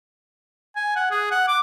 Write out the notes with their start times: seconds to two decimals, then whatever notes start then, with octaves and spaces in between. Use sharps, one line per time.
0.76 G#5
0.96 F#5
1.11 G#4
1.31 F#5
1.48 D6